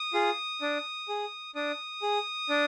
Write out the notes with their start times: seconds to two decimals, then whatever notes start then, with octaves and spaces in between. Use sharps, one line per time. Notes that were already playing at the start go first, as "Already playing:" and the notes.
Already playing: D#6
0.14 F4 G#4
0.62 D4
1.09 G#4
1.55 D4 D#6
2.02 G#4
2.50 D4